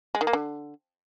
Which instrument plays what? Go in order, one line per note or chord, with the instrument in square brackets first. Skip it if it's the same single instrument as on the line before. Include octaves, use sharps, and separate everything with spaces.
[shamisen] G#3
D#3
A#3
D3